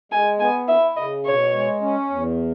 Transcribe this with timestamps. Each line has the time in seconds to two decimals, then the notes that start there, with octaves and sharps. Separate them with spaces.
0.12 G#3 G#5
0.39 B3 G#5
0.68 E4 E5
0.97 C#3 D#5
1.25 B2 C#5
1.53 G#3
1.81 C#4
2.10 E2